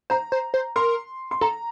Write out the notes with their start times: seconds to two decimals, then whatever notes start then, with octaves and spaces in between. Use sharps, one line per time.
0.10 C5 A#5
0.32 C5
0.54 C5
0.76 A#4 C6
1.31 C6
1.41 A4 A#5